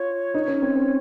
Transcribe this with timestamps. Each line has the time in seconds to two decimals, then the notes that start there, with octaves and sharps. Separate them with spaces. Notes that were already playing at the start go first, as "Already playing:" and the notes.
Already playing: F4 C#5
0.34 D#4
0.48 C#4
0.62 C4
0.75 C4